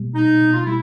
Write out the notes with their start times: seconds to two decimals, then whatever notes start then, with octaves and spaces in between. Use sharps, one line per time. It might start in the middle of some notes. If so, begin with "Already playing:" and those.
Already playing: B2 G3 A#3
0.14 B2 D#4
0.41 B2
0.53 F4
0.65 G3 E4